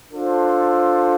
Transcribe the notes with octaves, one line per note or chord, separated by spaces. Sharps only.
D4 F4 A4 C5